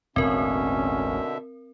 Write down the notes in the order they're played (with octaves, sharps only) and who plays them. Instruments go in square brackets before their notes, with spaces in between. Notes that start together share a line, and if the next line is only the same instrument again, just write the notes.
[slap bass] E1 A1 [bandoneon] B2 D3 E5 [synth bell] C4 A#4 [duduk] C#4